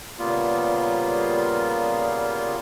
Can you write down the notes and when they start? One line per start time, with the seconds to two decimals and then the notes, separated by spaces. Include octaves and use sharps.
0.19 A#2 C#3 G3 A#3 B3 F4